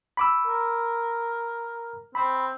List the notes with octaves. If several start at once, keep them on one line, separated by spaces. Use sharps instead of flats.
B5 D6 E6
A#4
C4 B5